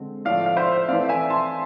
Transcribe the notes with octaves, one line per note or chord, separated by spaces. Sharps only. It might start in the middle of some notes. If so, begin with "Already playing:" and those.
Already playing: D3 G#3 C4
A2 F3 A3 D5 F5
F5
C5 E5
E3 A3 C4 D5 F5
E5 G#5
A5 C6